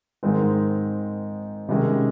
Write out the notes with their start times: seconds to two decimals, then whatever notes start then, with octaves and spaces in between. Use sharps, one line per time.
0.23 G#2 D#3 G#3 C4
1.68 C3 D#3 G#3 C#4